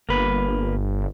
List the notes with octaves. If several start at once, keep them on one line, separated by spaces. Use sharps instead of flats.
G1 A#3 B4